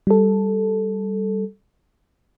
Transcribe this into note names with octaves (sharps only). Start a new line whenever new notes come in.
G3 A4